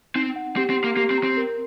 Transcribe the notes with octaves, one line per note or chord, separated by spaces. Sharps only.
C4 D#4
F#5
C4 G4
C4
C6
A#3
A#3 G4
C4
A#5
C4
A#4